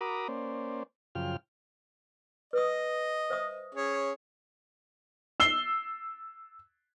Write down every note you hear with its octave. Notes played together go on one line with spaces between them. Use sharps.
F#4 A#4 A#5 B5 D6 D#6
A#3 C#4 C5 D5
F#2 C#3 F3 F4 G5 F6
B4 D#5 D#6
C5 E5 D#6
C#4 G#4 C#5
E6 C7 G7